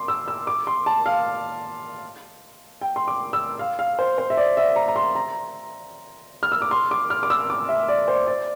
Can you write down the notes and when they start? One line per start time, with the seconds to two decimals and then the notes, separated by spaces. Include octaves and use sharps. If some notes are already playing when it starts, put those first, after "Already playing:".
Already playing: C6 D6
0.08 E6
0.28 E6
0.47 D6
0.67 C6
0.86 A5
1.06 F5
2.81 G5
2.96 C6
3.08 D6
3.33 E6
3.59 F5
3.79 F5
3.99 C5
4.18 C5
4.30 E5
4.37 D5
4.57 E5
4.76 A#5
4.88 A#5
4.96 C6
5.15 A#5
6.43 F6
6.52 E6
6.62 D6
6.71 C6
6.91 D6
7.10 F6
7.23 D6
7.30 E6
7.50 D6
7.69 E5
7.88 D5
8.08 C5
8.27 D5